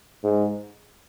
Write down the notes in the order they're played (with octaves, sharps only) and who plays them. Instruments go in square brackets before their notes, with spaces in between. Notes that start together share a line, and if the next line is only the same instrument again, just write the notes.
[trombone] G#2